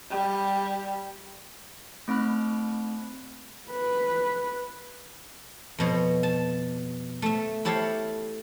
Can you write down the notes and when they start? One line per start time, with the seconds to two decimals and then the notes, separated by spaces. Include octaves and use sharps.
0.11 G3
2.08 A3 C4 D#4 B5 F#6
3.70 B4
5.79 F2 B2 C#5
6.23 A5
7.22 A3 E5
7.65 E4 G4 A4 C#5 E5 F5